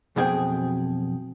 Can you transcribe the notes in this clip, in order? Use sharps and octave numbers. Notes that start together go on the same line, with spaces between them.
B1 F2 B2 G#4 C5 G5